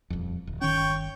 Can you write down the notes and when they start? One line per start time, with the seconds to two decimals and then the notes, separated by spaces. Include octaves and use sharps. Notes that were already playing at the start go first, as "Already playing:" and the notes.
0.10 D#1 F2
0.47 D1
0.61 G1 D#3 C#4 C#5 G5